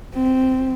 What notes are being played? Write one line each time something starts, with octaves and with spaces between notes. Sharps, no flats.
C4